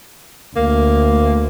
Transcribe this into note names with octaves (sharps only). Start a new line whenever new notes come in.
D2 A#3